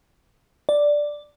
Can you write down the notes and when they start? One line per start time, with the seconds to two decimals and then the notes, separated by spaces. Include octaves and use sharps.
0.69 D5